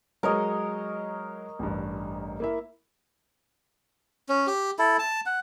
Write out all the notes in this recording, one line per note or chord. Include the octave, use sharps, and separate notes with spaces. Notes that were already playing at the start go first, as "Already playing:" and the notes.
F#3 G#3 A#4 C#5 D#5
A1 G2
A#3 E4 E5
C#4
G4
E4 A4
A5
F#5